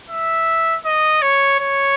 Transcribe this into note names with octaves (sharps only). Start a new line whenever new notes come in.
E5
D#5
C#5
C#5